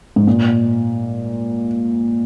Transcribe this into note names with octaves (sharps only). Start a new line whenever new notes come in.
G#2
A#2